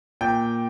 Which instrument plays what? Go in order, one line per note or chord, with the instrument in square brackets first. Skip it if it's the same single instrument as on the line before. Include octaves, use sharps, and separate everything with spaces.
[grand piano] A#2 G5